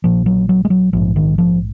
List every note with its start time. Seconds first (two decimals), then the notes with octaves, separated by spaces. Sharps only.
0.04 A#1 A#2 F3
0.26 F#3
0.49 F#3
0.65 G#3
0.70 F#3
0.93 A#1 G#2 F3
1.16 D#3
1.38 F3